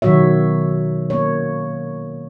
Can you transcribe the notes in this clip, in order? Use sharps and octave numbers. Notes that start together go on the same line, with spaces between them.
B2 D#3 F#3 F#4 C#5 E5
A#3 C#5